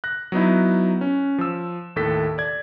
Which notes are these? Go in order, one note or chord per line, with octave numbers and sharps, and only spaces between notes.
F#6 A#6
F#3 B3 D#4 E4
C#4
F3 E6
D#2 A2 A4 B6
D5 G#6